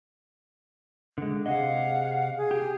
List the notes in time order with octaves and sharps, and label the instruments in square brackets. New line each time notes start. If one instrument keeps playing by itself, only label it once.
[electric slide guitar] D3 G#3
[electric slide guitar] C3 G#4 D#5 [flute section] F5 F#5
[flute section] G#4
[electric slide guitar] G4